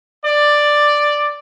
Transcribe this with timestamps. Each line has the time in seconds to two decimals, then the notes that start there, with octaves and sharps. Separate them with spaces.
0.24 D5